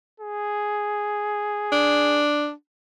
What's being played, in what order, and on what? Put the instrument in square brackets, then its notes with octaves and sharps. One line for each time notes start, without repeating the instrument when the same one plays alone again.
[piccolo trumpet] G#4
[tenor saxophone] D4